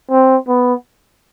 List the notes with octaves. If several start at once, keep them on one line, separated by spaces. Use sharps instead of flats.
C4
B3